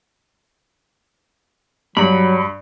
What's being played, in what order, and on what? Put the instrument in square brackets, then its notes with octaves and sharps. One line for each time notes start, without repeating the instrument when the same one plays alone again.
[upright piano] G2 [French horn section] F#3 [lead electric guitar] B5